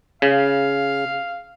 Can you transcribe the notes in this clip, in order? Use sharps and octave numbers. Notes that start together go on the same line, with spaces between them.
C#3 F5